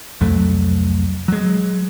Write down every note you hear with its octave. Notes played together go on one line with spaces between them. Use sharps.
C2 F2 F#3 A3
F#3 G#3